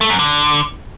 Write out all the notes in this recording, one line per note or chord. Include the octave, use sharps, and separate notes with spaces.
A3
F#2
D3